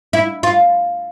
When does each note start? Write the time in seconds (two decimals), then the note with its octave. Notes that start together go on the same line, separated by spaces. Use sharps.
0.13 E4
0.43 F4